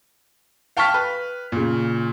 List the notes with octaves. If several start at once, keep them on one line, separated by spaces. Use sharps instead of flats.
F5 G5 A5 C#6 F6 B6
B4
A#2 C#3